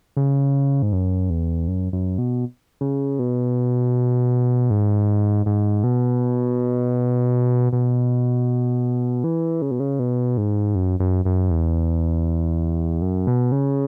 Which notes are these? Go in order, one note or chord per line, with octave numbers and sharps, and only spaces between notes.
C#3
G#2
F#2
E2
F#2
F#2
B2
C#3
B2
G#2
G#2
B2
B2
E3
C#3
B2
C#3
B2
G#2
F#2
F#2
F#2
E2
F#2
B2
C#3